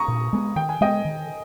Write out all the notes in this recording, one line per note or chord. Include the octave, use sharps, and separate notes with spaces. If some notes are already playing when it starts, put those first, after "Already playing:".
Already playing: A#5 C#6 D#6
A#2
G#3 B3
D#3 G5
G#5
G#3 B3 D#5 G5
D#3